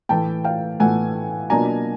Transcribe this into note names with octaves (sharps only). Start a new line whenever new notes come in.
A2 E3 A3 G5 A5
F5 G5
A2 E3 A3 F#5 G#5
B2 F#3 A#3 D4 F4 G#5 A#5